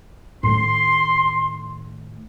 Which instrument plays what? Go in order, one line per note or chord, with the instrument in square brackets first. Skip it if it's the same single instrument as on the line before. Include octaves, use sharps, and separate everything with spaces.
[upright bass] A2 D#3 [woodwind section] C6